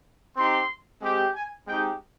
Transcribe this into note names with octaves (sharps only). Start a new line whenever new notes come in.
C4 D#4 G4 C6
G#3 C4 G4
G#5
G#3 C4 D#4 G4 G5